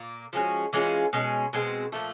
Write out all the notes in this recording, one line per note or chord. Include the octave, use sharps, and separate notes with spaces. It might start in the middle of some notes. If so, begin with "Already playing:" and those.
Already playing: A#2 A#3
F3 G#3 C#4 F#4
E3 G#3 C#4 F4
B2 G#3 C#4
B2 G#3 C4
A#2 F3 A3